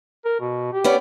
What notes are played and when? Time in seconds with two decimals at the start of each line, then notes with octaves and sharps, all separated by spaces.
0.25 A#4
0.40 B2
0.73 G4
0.84 B3 C#4 D5